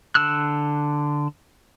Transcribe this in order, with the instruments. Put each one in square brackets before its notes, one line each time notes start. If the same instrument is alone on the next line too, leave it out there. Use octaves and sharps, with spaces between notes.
[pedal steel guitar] D3 E6 F#6